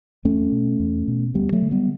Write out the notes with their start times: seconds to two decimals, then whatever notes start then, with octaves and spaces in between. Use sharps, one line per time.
0.25 E2 A3 C#4
0.52 B2
0.80 E2
1.08 B2
1.34 D2 G3 B3
1.53 F#3 A3
1.62 D3
1.71 G3 B3